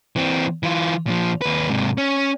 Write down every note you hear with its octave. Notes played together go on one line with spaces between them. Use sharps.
E3 C4
E3 F4
A#2 F3
D#2 B4
G#2 C3
C#4